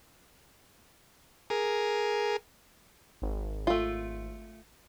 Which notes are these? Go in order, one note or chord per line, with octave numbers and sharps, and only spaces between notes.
G#4 A#4
G#1
A3 F4